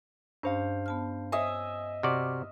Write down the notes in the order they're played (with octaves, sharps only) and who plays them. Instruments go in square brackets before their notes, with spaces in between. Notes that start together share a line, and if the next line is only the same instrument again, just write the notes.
[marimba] G2 C#4 [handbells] D4 C5 F5
[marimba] B3 A5 F6
[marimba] C5 C#5 [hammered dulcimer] D#5 E5 [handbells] G#5
[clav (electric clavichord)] C3 F#4 D5 [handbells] F6